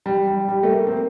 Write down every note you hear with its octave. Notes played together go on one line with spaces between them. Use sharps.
G3
G3
G3
A3
A#3
C4
A#3